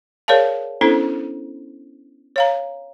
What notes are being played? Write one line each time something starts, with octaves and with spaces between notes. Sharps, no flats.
G#4 A#4 C#5 D5 F5 A5
B3 C#4 D4 E4 A4 C5
C#5 F5 A#5